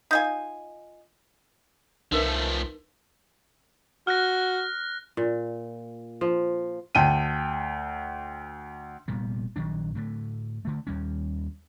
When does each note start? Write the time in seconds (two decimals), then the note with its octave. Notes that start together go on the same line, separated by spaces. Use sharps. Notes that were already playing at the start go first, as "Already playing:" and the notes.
0.11 D#4 F4 G#5
2.12 C2 F3 A3 D#4 A#4 B4
4.07 F#4 F6 F#6 A#6
5.17 A#2
6.21 F3
6.95 D2 G5 A5 D#7
9.08 F1 A#2 G3 B3
9.56 A#1 D#3 F#3 D4
9.95 A2 D3 A3
10.65 D3 A3
10.87 D#2 G3 C#4